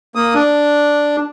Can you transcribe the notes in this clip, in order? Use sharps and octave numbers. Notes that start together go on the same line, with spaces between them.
A#3 D#6
D4